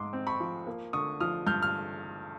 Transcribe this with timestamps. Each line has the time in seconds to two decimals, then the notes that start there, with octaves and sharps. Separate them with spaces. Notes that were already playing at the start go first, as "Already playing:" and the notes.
Already playing: G#2 G#3 C6 D6
0.13 C4
0.27 B5 C#6
0.40 F3
0.67 A#3
0.93 D3 C#6 D#6
1.20 F3 D#6 F6
1.46 G2 F6 G6
1.62 F6